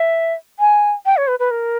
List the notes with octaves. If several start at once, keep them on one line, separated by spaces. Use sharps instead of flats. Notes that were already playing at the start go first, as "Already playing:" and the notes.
Already playing: E5
G#5
G5
C#5
B4
B4
A#4